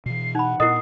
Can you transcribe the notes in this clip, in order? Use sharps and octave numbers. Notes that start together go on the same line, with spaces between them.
B2 E3 C7
D#4 F#5 B5
A#2 B3 E4 A#4 D#5 D#6 C7